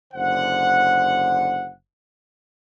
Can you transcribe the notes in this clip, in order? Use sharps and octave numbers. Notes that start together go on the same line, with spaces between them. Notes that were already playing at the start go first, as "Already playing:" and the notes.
F#1 D3 C5 F#5